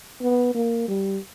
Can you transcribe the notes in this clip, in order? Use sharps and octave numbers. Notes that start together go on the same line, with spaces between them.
B3
A#3
G3